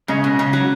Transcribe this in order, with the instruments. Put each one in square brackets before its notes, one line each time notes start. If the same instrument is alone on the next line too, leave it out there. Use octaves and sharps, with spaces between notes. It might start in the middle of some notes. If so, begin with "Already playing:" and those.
[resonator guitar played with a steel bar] C#3 [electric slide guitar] G#3 C#4 G#4 D#5
[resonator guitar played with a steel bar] B2
C#3
F#3